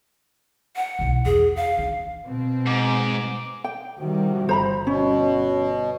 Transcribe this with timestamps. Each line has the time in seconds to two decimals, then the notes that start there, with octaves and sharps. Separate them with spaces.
0.76 F#5
0.99 B1 E4
1.26 E2 G#4
1.56 F5
1.78 D4 D#4
2.25 B2 C4
2.67 G#2 D6
3.64 G5
3.99 C3 D#3 F3 G3 F#4
4.49 G1 C5 A#5 B5
4.87 B2 C#4 F#4 C#5